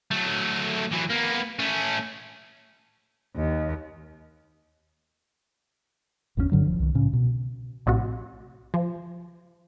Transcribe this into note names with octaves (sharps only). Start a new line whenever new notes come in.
F#3 A3
E3 F#3
A#3 B3
A3 C#4
D#2
G1 E2 D#3 C#4
G2 D3 F#3
D1 F3
C2 D#3
A2 C#3 C#4
B2
A#1 A2 C3 F#4
F3